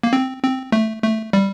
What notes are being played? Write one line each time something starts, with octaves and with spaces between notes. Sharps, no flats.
A#3
C4
C4
A3
A3
G3